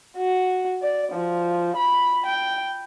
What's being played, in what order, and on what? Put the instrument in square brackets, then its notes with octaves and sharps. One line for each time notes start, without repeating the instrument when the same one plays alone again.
[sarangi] F#4
D5
F3
B5
G5